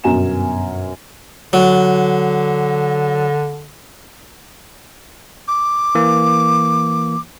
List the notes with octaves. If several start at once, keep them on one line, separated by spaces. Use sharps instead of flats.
G1 F#2 B2 G#5 A#5 E7
D3 F#3
D6
E3 A#3